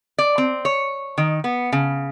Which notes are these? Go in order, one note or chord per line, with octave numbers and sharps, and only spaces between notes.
D5
C4
C#5
D#3
B3
C#3